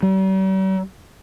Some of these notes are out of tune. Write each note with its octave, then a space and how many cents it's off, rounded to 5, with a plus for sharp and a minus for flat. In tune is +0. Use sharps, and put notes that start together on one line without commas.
G3 -45